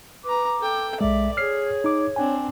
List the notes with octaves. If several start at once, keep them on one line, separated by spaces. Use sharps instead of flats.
B4 A#5 D6
A4 G5
B1 G#3 D5 E5
G#4 C#5 F6 C7
D#4 D6
C4 D4 G5 G#5